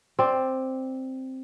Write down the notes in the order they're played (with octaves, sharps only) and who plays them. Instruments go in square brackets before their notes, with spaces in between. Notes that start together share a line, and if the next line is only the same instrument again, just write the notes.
[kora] C4 D5